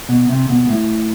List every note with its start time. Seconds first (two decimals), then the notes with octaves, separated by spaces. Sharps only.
0.09 B2
0.29 C3
0.49 B2
0.69 A2